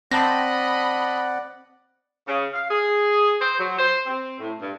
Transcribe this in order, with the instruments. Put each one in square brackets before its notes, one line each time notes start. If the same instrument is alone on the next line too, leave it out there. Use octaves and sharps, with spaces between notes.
[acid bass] C4 [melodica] D5 F#5 [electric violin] D#5 B5 [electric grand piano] A5 A#6
[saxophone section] C#3
F5
G#4
C5
F#3
C5
C4
A2
G2